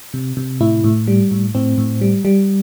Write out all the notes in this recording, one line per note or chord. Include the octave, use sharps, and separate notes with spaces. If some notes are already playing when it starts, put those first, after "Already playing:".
C3
C3
A2 E4
A2
G3
A2
A2 C4
A2
G3
G3